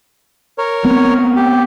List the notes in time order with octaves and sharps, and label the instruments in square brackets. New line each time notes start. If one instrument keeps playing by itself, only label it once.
[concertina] A#4 C#5
[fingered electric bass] B3 C4
[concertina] G4